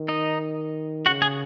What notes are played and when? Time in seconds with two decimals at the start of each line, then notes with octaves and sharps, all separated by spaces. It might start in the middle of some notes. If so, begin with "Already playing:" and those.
Already playing: D#3
0.08 D#4 D#5
1.06 C#3 F#4 F#5
1.22 G#4 G#5